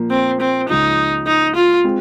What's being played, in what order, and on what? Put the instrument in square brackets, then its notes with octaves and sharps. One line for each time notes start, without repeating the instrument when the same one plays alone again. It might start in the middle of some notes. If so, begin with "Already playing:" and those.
Already playing: [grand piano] A#2 F3 A#3
[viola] C4
C4
[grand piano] C#2 C#3 F3 [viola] D#4
[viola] D#4
F4
[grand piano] G#3 C4